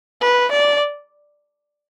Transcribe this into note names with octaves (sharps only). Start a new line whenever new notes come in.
B4
D5